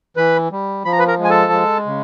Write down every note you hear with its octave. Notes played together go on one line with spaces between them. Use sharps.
E3 B4 B5
G3
F3 B5
A#5
B4 B5
A#4 A#5
G#3
G#5
A4 A5
G#3
C#3